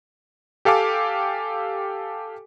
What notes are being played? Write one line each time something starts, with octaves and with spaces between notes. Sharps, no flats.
G4 A4 F5 G#5 D6